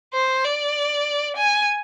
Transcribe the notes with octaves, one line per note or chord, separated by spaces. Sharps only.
C5
D5
G#5